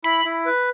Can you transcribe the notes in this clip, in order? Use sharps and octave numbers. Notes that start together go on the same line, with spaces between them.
E4 B5
E4
B4